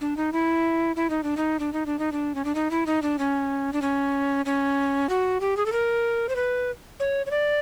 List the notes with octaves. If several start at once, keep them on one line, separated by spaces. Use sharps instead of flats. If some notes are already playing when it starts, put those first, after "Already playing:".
D4
D#4
E4
E4
D#4
D4
D#4
D4
D#4
D4
D#4
D4
C#4
D4
D#4
E4
D#4
D4
C#4
D4
C#4
C#4
F#4
G4
G#4
A4
A#4
C5
B4
C#5
C#5
D5